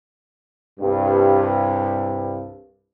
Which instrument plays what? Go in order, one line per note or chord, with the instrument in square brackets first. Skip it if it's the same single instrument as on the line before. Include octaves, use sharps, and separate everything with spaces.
[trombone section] C2 G2